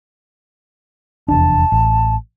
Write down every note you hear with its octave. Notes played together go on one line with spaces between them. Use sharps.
F1 E2 D4 A5
A1